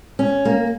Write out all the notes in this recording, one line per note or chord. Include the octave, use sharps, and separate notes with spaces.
C#4
A#3